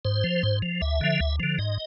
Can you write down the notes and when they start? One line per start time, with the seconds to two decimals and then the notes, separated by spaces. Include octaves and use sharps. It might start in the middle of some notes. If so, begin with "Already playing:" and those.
0.05 G#2 C5
0.24 F3
0.43 G#2
0.62 F3
0.81 D2 E5
1.01 D3 F3
1.20 D2
1.40 D3 F3
1.59 G#2 D#5